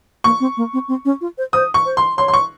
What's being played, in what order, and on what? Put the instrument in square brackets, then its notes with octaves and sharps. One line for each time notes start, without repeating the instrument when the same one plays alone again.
[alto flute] A#3 [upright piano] C#6
[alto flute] C4
A#3
C4
C4
C#4
F4
C5
[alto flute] C5 [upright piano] D#6
[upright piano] C#6
[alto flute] C5
[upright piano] C6
[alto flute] C#5 [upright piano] C6
[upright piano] C6
C#6